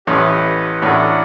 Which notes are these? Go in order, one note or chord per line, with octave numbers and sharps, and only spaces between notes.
A1 A2 G4 B4 D#5
A1 A2 D4 F#4 A#4 D5 F#5